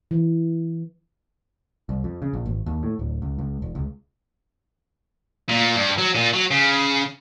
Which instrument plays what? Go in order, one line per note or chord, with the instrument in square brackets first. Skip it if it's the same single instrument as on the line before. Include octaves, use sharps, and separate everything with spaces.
[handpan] E3
[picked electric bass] C2
F2
C#3
A#1
G#1
D#2
A2
D1
C#2
C#2
E1
C#2
[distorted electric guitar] A#2
G2
F#3
A#2
F#3
C#3